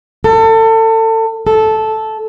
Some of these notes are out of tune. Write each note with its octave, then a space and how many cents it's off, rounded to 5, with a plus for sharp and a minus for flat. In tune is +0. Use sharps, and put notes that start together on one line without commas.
A4 +30
A4 -10